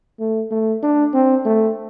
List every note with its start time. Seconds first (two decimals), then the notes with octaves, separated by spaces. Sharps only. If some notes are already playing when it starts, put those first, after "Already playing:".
0.20 A3
0.51 A3
0.83 D4
1.14 C4
1.46 A3